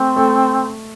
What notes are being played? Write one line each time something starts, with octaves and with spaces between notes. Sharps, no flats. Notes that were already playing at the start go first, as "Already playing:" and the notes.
Already playing: A3 C4
A3